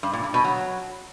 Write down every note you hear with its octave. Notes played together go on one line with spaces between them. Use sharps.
G2
A#2
G2
B2
F#3